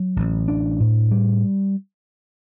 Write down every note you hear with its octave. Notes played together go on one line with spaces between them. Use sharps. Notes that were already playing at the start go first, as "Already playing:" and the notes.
Already playing: F#3
A1
D4
A2
G3